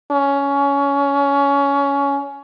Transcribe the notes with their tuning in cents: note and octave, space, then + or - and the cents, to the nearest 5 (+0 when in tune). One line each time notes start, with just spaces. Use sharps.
C#4 +20